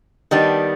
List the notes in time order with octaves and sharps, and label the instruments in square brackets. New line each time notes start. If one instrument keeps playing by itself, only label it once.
[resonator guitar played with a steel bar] D#3 G3 B3 D4